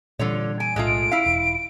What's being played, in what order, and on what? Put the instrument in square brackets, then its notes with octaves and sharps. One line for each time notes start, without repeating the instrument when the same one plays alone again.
[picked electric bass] A#2 E3 G3 [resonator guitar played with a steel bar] D3 F4 C#5
[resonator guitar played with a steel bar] G#5 [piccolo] D7
[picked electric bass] B1 A2 [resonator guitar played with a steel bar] G#3 A3 F4
[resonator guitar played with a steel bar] E4 F5
[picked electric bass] E1